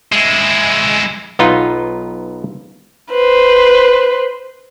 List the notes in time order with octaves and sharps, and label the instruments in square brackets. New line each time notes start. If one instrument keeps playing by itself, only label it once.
[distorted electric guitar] G#3 E4
[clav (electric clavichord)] B1 B3 D#4 F4
[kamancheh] B4 C5